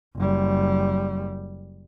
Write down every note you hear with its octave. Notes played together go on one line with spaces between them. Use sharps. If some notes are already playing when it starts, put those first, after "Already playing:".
F#1 G3